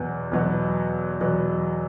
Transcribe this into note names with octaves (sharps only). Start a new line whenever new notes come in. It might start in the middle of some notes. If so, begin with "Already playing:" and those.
Already playing: E2 B2 F#3 B3
E2 B2 F#3 B3
E2 B2 F#3 B3